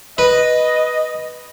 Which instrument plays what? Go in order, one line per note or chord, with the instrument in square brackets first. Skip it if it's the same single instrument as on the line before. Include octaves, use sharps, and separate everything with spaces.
[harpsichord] B4 [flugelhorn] D#5